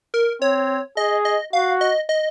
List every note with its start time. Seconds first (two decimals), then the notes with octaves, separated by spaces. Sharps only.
0.14 A#4
0.42 C4 C#5
0.97 G#4 D#5
1.25 D#5
1.53 F#4 F5
1.81 D#5
2.09 D#5